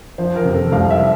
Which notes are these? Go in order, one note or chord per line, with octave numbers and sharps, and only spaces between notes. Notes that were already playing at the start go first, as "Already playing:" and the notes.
F3 C5
A#4
C3
A4
C2 F5
E5